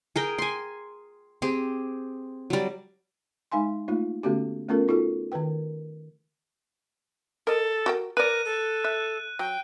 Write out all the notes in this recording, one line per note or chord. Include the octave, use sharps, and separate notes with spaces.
G#4 A#4 G5
G#5 C6
C4 G4 G#4
F#3 G3
G#3 D#4 F5 G#5 C6
A3 A#3 D#4 F4
D3 A3 B3 C#4 F#4 G4
A3 B3 C#4 F4 A4 A#4
D#4 F4 F#4 A4
D#3 A#4 B4 G5
A4 A#4 D#5
F#4 A#4 G5
A#4 B4 D5 F#6 D#7
A4
E5 F#6
F#3 G5